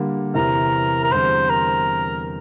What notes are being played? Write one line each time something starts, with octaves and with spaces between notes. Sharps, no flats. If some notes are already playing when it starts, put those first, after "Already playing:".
Already playing: D3 G3 A#3
E2 C3 E3 A#4
A#4
E2 D3 G3 C4 C5
A#4